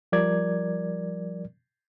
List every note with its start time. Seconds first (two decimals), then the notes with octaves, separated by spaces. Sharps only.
0.12 F3 G3 A#4 D5 G#6